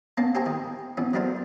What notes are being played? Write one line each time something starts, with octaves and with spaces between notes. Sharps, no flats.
A#3 B3 C#4 A5
G4 A4 C5 G#5 A#5 C#6
D#3
E3 B3 C#4
F#3 A3 B3 D4 A#4 C5